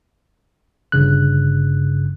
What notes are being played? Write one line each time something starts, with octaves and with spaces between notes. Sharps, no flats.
G1 G2 C#3 F#6